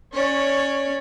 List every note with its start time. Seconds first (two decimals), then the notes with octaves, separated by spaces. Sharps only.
0.13 C#4 C#5 D5